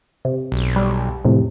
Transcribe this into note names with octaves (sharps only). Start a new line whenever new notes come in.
C3
B1
G3
F2 A2 C3